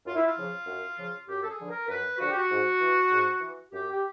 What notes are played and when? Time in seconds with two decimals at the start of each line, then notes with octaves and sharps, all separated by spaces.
0.06 F#2 F4
0.15 E4
0.26 F4
0.36 C#3 F3
0.67 F#2
0.98 C#3 F3
1.28 F#2 G4
1.43 A4
1.48 G#4
1.58 D3 F3
1.68 A#4
1.88 F#2 B4
2.18 D3 F3 F#4
2.28 G4
2.35 F#4
2.49 G#2
2.80 E3
3.11 G#2
3.40 E3
3.71 F#2 G4
3.91 G4